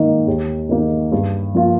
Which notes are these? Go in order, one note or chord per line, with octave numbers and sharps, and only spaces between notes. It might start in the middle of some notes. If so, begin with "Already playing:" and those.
Already playing: G#2 D#3 A#3 D#4
D#2
D#3 A#3 D#4
G2
F3 A#3 F4